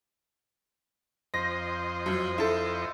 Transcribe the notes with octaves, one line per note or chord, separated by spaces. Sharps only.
F2 C5 D#5 A#6
F#2
E4 A4